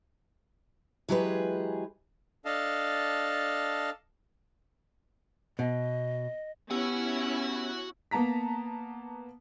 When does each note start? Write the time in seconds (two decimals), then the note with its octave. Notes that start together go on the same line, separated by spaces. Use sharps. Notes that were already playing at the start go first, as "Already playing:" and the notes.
1.09 E3 F#3 G#3 G4 G#4 B4
2.45 D4 A4 D#5 F5 A5
5.59 B2 D#5
6.71 B3 C#4 E4 F#4 G4 F#5 E6
8.11 A#3 B3 A5 A#5 B6